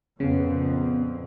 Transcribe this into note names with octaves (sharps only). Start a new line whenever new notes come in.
F2 A#2 C#3 B3